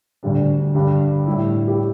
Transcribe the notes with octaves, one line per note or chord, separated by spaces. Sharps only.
D2 D3 G3 D4
G2 D3 G3
A2 G3 E4
G4